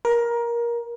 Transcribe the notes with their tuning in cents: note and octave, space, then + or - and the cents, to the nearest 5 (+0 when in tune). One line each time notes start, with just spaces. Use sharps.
A#4 +20